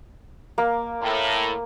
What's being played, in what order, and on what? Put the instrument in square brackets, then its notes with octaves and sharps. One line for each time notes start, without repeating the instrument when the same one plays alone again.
[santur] A#3
[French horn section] A2